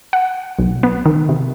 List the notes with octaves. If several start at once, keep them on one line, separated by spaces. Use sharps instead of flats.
F#5
B1
B3
D#3
C3